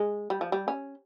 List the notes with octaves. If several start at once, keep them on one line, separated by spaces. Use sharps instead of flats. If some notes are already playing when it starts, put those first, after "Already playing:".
Already playing: G#3
G3
F3
G3
C#4